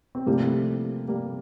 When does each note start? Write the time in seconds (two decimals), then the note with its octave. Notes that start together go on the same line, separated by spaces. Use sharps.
0.15 C4
0.26 C3 F3 G3 A3 A#3 E4 G4
1.08 G3 A#3